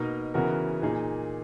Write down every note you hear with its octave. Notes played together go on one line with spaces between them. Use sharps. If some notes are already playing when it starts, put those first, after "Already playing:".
Already playing: B2 A#3 D#4 A#4 D#5
C#3 E3 B3 F#4 A#4
A#2 A#3 D#4 G#4